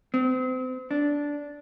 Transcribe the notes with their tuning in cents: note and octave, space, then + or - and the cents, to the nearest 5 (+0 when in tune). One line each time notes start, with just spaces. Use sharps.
C4 -35
D4 -10